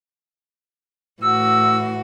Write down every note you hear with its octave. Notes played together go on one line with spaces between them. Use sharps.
A2 E3 F#4 E6